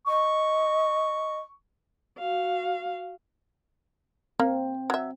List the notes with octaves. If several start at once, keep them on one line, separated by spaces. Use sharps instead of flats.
D#5 C#6
F#4 F5
A#3 C4
F#3 E5